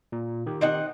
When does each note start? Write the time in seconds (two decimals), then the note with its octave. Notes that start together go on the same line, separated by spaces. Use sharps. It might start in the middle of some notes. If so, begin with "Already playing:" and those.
0.12 A#2
0.46 D#3 G4
0.61 C4 D#4 F#5